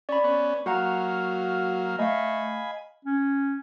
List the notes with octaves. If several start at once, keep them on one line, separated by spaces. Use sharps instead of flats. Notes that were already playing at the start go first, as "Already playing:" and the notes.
C#4 D5 B5
B3 C#4
F#3 A#3 F#4 F5 F#5 A#5
A3 D#5 F5 G#5 B5
C#4